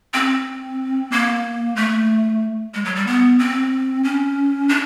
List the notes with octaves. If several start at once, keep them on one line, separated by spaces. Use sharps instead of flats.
C4
A#3
A3
G#3
F#3
G3
B3
C4
C#4
D4